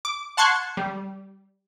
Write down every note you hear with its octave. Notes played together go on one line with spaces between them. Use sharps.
D6
F#5 A5 C6 C#6 F#6 G#6
G3